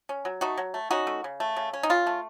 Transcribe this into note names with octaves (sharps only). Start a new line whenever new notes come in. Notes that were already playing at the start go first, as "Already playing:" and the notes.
C#4
F#3
A3 D#4 F#4
F#3
A3
C#4 D#4 F#4
A3
C#3
A3
C#3
C#4
D#4
C#3 F4
A3